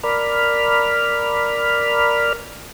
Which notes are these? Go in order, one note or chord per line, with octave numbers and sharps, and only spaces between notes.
A#4 D5 B5 F6